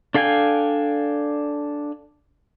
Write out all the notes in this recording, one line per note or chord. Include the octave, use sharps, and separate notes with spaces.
D4 A4 F5 G5 G#5